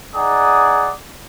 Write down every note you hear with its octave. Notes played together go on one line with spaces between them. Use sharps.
D#4 G#4 D5 F#5 D#6